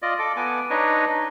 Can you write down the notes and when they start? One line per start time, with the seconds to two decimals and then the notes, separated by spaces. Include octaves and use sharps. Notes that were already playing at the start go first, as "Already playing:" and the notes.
0.02 F4 D5 D#5
0.19 A4 D6
0.36 B3 G#5 D6
0.70 D4 D#4 B4 C#5 D#5